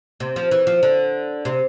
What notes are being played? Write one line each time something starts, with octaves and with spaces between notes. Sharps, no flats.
C3
F3
E3
F3
D3
C3